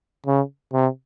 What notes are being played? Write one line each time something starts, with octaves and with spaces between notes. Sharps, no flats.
C#3
C3